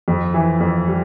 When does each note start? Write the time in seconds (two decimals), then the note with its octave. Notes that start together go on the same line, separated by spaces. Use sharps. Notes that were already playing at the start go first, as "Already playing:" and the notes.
0.08 F2
0.34 E3
0.60 F2
0.88 G3